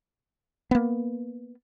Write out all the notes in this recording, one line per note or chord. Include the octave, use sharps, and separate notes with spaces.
A#3 B3